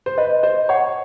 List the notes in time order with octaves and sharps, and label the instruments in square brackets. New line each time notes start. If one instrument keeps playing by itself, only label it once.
[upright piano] C5
[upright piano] B4 [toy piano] D#5
[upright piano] C5 [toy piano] D#5
[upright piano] C#5 [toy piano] F#5